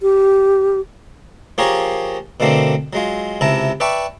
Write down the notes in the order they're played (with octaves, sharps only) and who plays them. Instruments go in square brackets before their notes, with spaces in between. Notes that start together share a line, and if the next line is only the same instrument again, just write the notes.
[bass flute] G4
[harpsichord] F3 A#3 G4 G#4 A#4 C#5
B2 D3 A3 A#3 C4 D4
F#3 G#3 F4
C#2 C3 E4 A5 A#5
B4 D5 E5 G5 A5 C#6